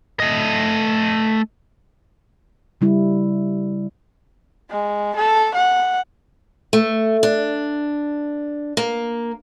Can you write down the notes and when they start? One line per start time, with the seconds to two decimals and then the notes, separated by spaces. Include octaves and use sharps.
0.20 A3 D#5
2.81 C#3 G3 E4
4.70 G#3
5.16 A4
5.54 F#5
6.73 A3
7.23 D4
8.77 A#3